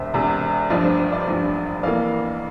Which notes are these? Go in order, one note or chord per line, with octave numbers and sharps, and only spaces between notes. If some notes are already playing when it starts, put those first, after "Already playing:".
Already playing: E1 E2 C3 C5 E5
E1 E2 C3
A1 G2 F3 D5
C5
C5
D5
A1 G2 F3
F2 E3 A#3 D5 F5